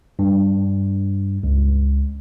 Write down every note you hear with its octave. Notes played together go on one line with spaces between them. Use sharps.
G2
C#2